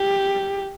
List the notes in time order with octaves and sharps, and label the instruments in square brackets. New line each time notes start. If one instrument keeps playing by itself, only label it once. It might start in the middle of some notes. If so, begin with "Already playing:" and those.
Already playing: [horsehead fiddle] G4